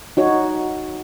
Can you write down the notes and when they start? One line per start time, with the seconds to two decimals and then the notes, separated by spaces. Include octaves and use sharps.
0.17 D#4 F#4 C#5